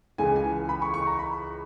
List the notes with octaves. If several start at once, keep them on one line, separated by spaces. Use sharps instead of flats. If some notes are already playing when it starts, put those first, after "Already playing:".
C#2 C#3 E3 G#5
G#5
B5
C#6
C#6
A#5
B5